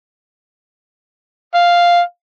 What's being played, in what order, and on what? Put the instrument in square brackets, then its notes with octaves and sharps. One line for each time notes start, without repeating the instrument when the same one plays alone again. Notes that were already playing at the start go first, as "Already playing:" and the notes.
[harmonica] F5